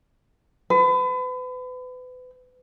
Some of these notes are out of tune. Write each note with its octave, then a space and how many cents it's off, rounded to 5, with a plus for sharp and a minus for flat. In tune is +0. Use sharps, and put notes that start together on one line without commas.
B4 +35